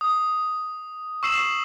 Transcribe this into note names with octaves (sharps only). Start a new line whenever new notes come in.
D#6
C#6 E6 C7 E7 F#7